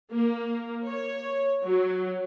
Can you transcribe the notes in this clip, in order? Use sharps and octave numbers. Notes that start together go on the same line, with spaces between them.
A#3
C#5
F#3